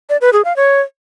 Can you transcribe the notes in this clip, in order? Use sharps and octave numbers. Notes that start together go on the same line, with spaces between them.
D5
B4
G#4
F5
C#5